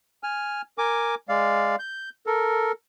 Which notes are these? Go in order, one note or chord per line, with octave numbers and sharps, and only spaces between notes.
G#5 F6
A#4 G#5 D6
G#3 D5 F5
G6
A4 A#4